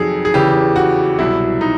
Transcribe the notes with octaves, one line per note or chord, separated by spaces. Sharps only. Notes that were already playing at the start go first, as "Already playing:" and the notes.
Already playing: F2 C3 D#3 F#3 G#4 A4
G#4
E2 C#3 E3 G4
F#4
C2 B2 F#3 E4
D#4